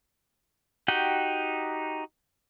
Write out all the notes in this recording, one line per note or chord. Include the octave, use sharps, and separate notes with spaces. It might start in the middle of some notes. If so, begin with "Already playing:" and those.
D#4 F#4 G4 F#5 G5